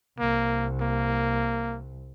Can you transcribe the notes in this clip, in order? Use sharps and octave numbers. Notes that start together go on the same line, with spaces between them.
C2 A#3
A#3